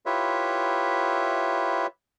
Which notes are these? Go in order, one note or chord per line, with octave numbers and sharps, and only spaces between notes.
E4 F4 G4 B4 C#5 E5